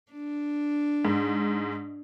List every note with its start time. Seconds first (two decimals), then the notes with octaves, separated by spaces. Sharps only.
0.12 D4
1.05 G#2